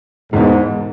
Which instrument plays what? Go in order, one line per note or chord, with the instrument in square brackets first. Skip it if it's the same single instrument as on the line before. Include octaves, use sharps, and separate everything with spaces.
[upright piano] E1 E2 B2 [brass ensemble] G#2